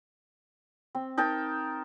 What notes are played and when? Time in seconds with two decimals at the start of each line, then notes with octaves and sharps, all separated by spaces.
0.95 C4
1.18 D#4 A#4 G5 A5